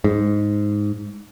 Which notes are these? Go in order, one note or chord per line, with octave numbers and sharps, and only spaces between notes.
G#2